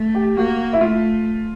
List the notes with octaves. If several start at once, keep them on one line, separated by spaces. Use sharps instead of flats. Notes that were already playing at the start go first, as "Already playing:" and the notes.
Already playing: A3
G4
A#3 F#4
E4
A3 F4